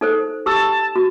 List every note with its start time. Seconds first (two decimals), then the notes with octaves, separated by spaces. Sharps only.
0.01 D#4 A4 C5
0.46 G4 A5 E6
0.96 F#4